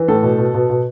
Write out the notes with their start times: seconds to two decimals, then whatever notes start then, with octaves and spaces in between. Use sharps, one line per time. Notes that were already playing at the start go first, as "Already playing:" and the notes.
Already playing: E3
0.08 A2 A4
0.23 B2
0.38 B2
0.54 B2
0.70 B2